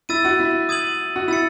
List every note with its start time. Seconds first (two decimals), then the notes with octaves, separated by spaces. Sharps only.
0.09 E4 E6 A6 D#7
0.25 F#4
0.40 E4
0.69 D#6 G#6 D#7 F#7
1.16 F#4
1.28 E4 E6 A6 C#7